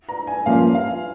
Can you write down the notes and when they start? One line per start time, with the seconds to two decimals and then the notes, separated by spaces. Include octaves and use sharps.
0.09 A#5
0.27 G#5
0.46 G2 F3 A#3 C#4 G4 F5
0.75 F5